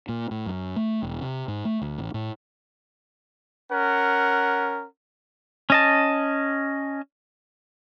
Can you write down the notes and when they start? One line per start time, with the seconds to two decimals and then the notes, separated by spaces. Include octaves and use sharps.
0.09 A#2
0.31 A2
0.46 F#2
0.76 A3
1.02 E1
1.21 C3
1.48 G#2
1.65 A3
1.82 D2
1.98 A1
2.14 A2
3.72 C#4 A#4 F#5
5.70 C#4 D#5 A5